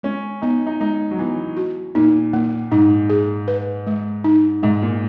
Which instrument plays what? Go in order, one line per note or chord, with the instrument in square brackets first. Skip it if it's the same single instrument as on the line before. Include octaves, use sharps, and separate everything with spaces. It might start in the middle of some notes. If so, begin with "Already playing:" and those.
[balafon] G#3 [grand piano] C#4
[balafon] B3 [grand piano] D#4
[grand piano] D#4
[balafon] G#3 [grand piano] D#4
[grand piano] F#3
[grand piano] E3 [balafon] B3
[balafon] F#4
[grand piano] A#2 [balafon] D#4
[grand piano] A#2 [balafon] A#3
[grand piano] G#2 [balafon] D#4
[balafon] G#4
B4
G#3
D#4
[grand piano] G#2 [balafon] G#3
[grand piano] A#2